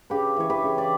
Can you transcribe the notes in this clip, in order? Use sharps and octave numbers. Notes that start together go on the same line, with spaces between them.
C#3 G4 B4
E3 C#5
G4 B4
C#3
D5